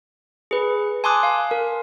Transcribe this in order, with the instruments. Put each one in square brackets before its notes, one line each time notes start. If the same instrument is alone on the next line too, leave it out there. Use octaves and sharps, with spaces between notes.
[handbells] G#4 B4
G#5 A5 C6 D6 D#6 F#6
F5
A#4